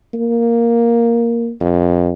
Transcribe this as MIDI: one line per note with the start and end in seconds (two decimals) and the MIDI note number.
0.14 1.51 58
1.60 2.11 41